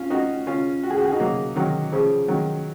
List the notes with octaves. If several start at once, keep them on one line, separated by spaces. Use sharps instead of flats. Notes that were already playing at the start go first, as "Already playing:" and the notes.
Already playing: C#4 F4
D#4 F#4
C#4 F4
F#4
G#4
F#4
G#4
D#4 F#4
F#3 A#3
D#3 F#3
C#3 F3
D#3 F#3